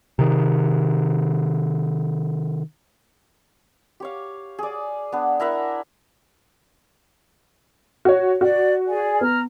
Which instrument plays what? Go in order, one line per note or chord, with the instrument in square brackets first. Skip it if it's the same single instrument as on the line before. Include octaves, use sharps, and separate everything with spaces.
[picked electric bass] C3 D#3
[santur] G4 C#5 F5
G#4 D5
B3 D4
E4 A#4 E5 F#5
[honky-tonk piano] F#4 C#5
[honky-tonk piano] F#4 [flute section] D5
[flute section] G#4 D5 G#5
[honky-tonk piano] B3 [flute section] A#5 F6